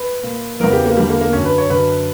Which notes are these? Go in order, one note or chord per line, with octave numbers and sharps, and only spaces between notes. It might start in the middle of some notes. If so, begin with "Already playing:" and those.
Already playing: B4
A#2
E2 C#3 E3 A#4
G4
A#3
E2 D3 G3
A#3
A#3
F#2 D3 C#4
B4
C#5
F#2 D3 B4